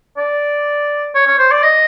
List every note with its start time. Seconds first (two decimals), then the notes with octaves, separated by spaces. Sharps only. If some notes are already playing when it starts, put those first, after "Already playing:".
0.17 D5
1.15 C#5
1.27 C#5
1.38 C5
1.51 D5
1.63 D#5